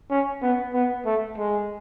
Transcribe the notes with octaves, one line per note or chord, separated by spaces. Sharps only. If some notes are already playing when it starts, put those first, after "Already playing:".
C#4
B3
B3
A3
G#3